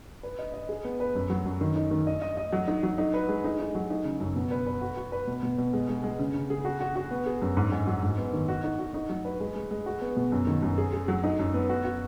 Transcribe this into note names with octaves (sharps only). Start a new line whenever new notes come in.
B4
D#5
D#5
G#4
B3
B4
F#2
F#3
F#2
D#3
D#4
D#3
D#5
D#5
D#5
F#3
D#4
F#3
D#4
B4
G#3
D#4
D#4
F#3
D#4
C#3
F#2
B2
B4
B4
F#4
F#4
B4
B2
B2
B2
G#3
G#3
G#3
C#3
C#3
G#4
F#4
F#4
F#4
B3
G#4
F#2
G#2
G#2
F#3
G#2
B3
D#3
F#4
D#4
F#4
D#4
F#3
B4
G#3
G#3
G#3
F#4
B3
B2
F#2
D#3
F#2
G#4
G#4
F#3
D#4
F#2
B3
F#4
F#4